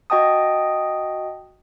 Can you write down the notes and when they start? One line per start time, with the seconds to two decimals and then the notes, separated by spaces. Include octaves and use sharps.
0.10 F#4 D#5 G5 A5 D#6